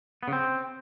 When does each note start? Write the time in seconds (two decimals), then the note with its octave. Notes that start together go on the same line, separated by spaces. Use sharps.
0.23 B3
0.28 C#3
0.33 C4